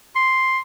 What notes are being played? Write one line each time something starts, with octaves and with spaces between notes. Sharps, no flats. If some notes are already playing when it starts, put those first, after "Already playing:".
C6